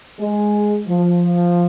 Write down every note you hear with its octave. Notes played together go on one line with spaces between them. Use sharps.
G#3
F3